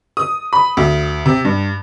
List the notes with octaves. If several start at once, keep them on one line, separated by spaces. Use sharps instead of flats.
D#6
B5
D2
C3
G2